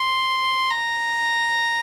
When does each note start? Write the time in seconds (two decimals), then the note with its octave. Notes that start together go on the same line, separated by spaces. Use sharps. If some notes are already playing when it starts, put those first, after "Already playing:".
Already playing: C6
0.71 A#5